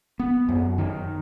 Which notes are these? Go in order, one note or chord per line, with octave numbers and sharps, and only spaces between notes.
B3
F#2
D#3